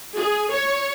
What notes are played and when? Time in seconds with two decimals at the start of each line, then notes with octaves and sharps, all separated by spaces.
0.16 G#4
0.52 C#5